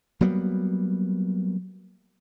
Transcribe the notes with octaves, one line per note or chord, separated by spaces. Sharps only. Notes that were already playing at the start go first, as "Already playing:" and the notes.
F#3 G3 A#3 B3